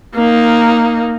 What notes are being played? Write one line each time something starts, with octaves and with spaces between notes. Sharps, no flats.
A#3 D#4